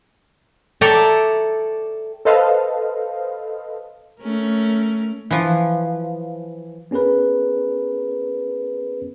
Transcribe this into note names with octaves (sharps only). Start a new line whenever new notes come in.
A4 C#5 D5 E5 G5 A#5
A4 B4 C5 D#5 F5
A3 C#4 A#4
E3 F3
B3 C#4 G#4 A#4 B4